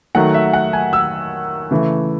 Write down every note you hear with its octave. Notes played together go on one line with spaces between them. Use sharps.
D#3 F#3 A3 F#5
E5
F#5
G#5
E6
C#3 E3 A3